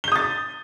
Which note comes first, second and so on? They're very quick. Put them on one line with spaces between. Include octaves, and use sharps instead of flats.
G7 G6 D#6 A6